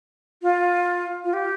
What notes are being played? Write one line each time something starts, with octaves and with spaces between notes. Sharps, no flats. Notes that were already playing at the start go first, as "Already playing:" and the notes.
F4
F4
G4